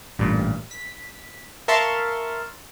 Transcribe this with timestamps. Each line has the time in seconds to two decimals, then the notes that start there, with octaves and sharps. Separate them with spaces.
0.19 A1 G2 A#2
0.71 B6
1.68 A#4 E5 F5 A5 C6 C#6